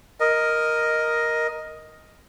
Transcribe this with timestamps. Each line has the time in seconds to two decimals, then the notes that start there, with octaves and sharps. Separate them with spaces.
0.20 A#4 D#5